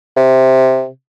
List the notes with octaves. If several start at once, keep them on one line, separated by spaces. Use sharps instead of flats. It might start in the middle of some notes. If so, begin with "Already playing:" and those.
C3